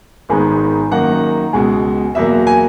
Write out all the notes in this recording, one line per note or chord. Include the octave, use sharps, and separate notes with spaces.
G#1 G#2 D#3 G#3 B3
F#2 D#3 F#3 A#3 F#5
C#2 B2 G#3
E2 B2 F#3 A#3 E5
G#5